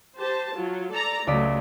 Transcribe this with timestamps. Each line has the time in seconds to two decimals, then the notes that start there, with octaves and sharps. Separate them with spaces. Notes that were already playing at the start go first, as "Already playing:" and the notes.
0.18 G4 C5 A5
0.55 F#3 F4
0.92 A4 D5 A#5
1.27 C#2 F#3 A3 D5 B6